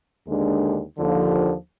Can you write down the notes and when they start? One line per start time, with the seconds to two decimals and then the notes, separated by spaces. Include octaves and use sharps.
0.25 D#2 D3 G#3 D4
0.97 D#2 D3 F3